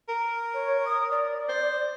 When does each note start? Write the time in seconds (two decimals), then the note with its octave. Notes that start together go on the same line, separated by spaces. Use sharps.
0.09 A#4
0.54 C#5
0.85 D#6
1.11 D5
1.49 C5